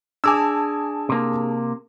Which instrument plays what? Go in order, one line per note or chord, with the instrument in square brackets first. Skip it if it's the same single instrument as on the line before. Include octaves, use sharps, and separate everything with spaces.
[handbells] D4 G#4 A5 [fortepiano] G#5 D6 E6
[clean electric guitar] C3 A#3